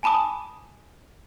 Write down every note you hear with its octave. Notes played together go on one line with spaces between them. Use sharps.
G#5 A5 B5 D6 D#6